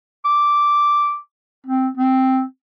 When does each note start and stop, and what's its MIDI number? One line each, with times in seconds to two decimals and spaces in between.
0.25 1.17 86
1.66 1.88 60
1.97 2.42 60